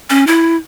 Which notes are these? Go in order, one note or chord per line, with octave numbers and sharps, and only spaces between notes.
C#4
E4